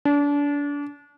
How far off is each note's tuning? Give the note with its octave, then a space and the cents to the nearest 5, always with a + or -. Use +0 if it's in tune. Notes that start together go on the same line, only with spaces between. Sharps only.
D4 -30